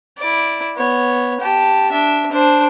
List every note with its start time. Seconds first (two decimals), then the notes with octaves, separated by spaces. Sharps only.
0.18 E4 D5
0.76 B3 C#5
1.40 G4 A5
1.92 D4 E5
2.31 D4 C5